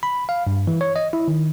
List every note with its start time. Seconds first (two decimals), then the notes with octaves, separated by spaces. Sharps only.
0.03 B5
0.29 F5
0.47 G2
0.67 E3
0.81 C#5
0.96 D#5
1.13 E4
1.28 D#3